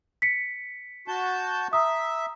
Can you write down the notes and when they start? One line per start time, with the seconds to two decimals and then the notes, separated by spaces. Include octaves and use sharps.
0.22 B6 C#7
1.08 F#4 A5 G6
1.73 E5 A#5 D#6